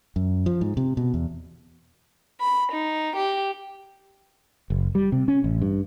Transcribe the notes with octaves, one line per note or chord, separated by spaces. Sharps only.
F#2
F3
G#2
C3
B2
E2
B5
D#4
G4
F#1
G3
C3
C#4
A1
G2